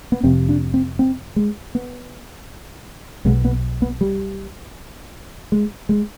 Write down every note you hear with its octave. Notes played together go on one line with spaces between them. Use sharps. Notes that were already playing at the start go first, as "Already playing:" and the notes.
B3
F1 F2 C3 C4
D4
C4
C4
G#3
B3
B1 B2 G#3
B3
B3
G3
G#3
G#3